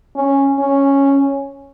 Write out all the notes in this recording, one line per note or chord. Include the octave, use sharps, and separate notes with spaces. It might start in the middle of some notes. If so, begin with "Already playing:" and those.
C#4
C#4